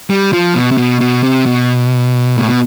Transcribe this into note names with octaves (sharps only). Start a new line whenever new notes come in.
G3
F3
B2
C3
B2
B2
C3
B2
A2
B2